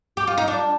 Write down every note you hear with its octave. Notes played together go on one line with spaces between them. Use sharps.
G4
F4
D#4
D4